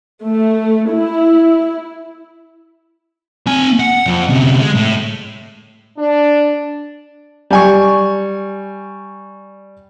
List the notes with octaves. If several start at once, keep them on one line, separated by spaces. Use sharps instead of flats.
A3
E4
C4 G#5
F#5
F2
D2 C3
G#3
A2
D4
G3 G#5 C#6